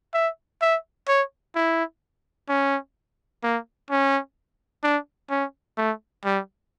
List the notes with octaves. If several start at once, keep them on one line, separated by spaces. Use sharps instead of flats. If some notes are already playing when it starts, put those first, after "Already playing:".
E5
E5
C#5
E4
C#4
A#3
C#4
D4
C#4
A3
G3